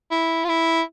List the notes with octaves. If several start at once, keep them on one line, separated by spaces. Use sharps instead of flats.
E4
F4
E4